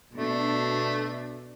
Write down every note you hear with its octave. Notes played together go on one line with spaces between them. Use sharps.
B2 A3 D4